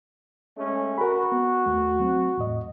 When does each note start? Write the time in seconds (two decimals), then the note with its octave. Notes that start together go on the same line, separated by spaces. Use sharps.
0.57 G#3 A3 C#4
0.98 F#4 A#4 B5
1.32 B3
1.66 D#2 A3
2.00 F#3 C4
2.37 E2 A2 D#5